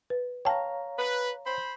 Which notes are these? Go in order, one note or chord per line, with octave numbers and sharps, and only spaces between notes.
B4
C#5 F5 G5 A5 A#5
B4
C5 B5